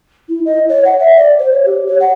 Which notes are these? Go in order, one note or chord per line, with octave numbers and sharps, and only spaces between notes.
E4
D#5
C#5
F#5
E5
D5
C5
C#5
G4
C#5
F#5